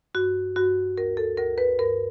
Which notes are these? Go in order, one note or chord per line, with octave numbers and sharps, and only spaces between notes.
G2 F#4
G2 F#4
D2 A#4
A4
D2 A#4
B4
G2 A#4